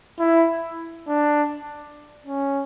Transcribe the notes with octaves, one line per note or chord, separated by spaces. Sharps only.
E4
D4
C#4